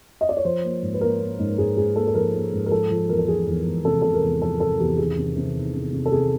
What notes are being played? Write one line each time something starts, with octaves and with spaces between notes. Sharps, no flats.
D#5
D5
C#5
F3 C5
A#3
G#2
B4
A#3 A#4
A#3
G#2
G#2 G#4
G#2 G#4
A#3 A4
A4
F3 A#4
A#3
G#2
A#4
F3 A4
F3
E2 A#4
A4
F3 G#4
E2
E2
C3 A4
C3 A4
A#4
E2
F3 A4
C3 A4
E2 G4
D#3 G#4
C3
C3
D#3
C3
C3
A4
C3 G#4